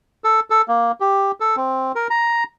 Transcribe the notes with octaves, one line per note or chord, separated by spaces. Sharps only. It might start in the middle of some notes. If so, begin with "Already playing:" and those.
A4
A4
A#3
G4
A4
C4
A#4
A#5